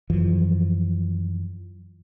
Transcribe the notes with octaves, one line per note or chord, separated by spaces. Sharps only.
F#2 E3 F3